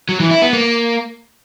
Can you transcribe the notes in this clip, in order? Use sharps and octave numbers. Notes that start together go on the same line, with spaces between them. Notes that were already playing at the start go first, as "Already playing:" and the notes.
F#3
E3
E4
B3
A#3